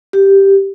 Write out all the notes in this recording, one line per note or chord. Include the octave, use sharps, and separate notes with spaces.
G4